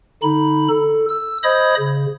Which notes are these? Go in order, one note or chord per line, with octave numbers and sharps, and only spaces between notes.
D3 D#4 B5
A4
E6
C5 D#5 B5 D#6 G6 G#6
C#3